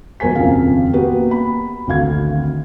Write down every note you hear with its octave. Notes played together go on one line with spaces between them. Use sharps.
B1 E2 A#4 C5 G#5 B6
D#1 F2 C#3 F3 C4 F5
A#3 B3 F#4 G4 B4
B5
G#1 D2 F5 G#6